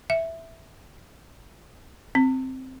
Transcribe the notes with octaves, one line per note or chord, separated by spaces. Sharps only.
E5
C4